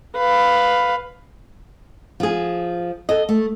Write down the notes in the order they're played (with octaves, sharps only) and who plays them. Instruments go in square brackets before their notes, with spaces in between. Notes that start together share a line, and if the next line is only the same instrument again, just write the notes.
[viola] B4 F5
[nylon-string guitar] F3 G#4
A4 D#5
A3